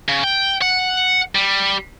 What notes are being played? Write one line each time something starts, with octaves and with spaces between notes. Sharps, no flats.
C#3
G5
F#5
G3